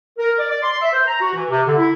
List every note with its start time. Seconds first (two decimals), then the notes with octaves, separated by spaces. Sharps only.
0.18 A#4
0.39 D5
0.51 D5
0.63 C6
0.82 E5
0.93 C5
1.07 A#5
1.21 F#4
1.34 E3
1.50 C3
1.67 D3
1.78 E4